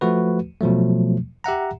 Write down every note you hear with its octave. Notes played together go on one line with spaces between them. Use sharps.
F3 A3 F#4 B4
B2 F3 F#3 A3
G4 E5 F#5 A#5